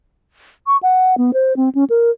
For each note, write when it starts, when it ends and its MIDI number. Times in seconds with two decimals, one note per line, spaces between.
0.67 0.77 85
0.83 1.15 78
1.17 1.31 59
1.33 1.56 72
1.56 1.69 60
1.75 1.84 61
1.90 2.10 70